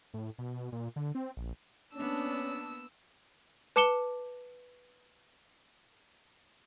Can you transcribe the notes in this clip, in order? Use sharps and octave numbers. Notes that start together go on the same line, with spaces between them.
A2
B2
A#2
D3
C4
A#1
A#3 B3 C#4 D4 E6
B4 A5 D6 C#7 E7 G7